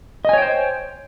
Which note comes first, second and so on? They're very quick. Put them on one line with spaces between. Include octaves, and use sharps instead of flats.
D#5 G#5 C#5 G5 C5